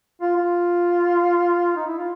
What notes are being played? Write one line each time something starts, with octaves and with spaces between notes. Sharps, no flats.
F4
F4
D#4
E4
F4